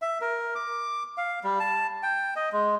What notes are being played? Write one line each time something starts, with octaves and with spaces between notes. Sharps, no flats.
E5
A#4
D6
F5
G3
A5
G5
D#5
G#3